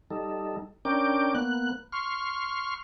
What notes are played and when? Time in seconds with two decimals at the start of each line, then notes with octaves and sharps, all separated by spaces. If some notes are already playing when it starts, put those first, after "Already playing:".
0.10 G3 D#4 A4
0.85 C#4 D4 A#4 G5 D6
1.35 A#3 B3 F#6
1.92 C6 C#6 F6